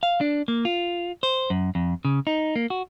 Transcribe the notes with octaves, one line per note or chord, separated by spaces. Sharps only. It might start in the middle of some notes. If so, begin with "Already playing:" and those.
F5
D4
A#3
F4
C5
F#2
F2
C#3
D#4
A#3
F#4